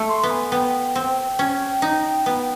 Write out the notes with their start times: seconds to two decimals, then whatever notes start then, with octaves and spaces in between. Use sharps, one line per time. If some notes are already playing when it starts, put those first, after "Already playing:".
Already playing: A3
0.09 C6
0.23 B3
0.31 G#5
0.52 B3 G5
0.95 C4
1.39 C#4
1.82 D#4
2.26 B3